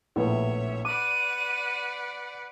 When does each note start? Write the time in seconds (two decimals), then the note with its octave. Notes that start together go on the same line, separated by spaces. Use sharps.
0.16 A#1 A2 B3 C#5 E5
0.85 B4 D5 F#5 D6 D#7